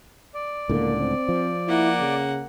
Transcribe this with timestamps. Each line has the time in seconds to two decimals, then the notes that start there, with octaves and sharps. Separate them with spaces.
0.34 D5
0.70 C#2 A2 D3 A#3
1.00 C4
1.29 F3
1.68 A#3 E4 F#5
2.00 C#3